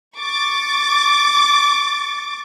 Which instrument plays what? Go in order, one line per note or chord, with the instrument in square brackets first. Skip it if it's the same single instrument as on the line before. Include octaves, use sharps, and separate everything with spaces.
[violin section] C#6 D6 A6